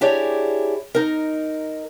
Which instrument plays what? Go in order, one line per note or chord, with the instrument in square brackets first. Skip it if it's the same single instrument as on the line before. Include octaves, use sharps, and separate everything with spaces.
[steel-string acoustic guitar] D4 E4 G4 G#4 C#5 D5
D#4 A#4